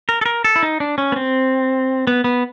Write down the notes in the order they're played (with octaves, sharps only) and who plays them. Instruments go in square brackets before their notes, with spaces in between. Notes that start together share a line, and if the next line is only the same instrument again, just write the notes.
[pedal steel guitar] A#4
A4
A#4
A4
E4
D#4
D4
C#4
B3
C4
B3
B3